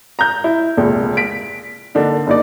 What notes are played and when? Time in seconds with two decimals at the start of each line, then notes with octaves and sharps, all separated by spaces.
0.19 A#5 G6
0.44 E4
0.77 F1 C#2 A#2
1.17 B6 D7
1.95 D3 A#3 D4 D#4
2.27 F#1 D#4 D5